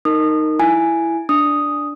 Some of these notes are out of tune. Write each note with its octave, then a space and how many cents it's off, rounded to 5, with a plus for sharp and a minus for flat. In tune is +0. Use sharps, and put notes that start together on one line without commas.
D#4 +0 A#4 -15 D#6 -25
E4 +10 G#5 +0
D4 +0 D#6 +0